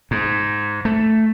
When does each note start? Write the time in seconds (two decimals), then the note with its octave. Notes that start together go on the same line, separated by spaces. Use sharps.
0.11 G#2
0.85 A3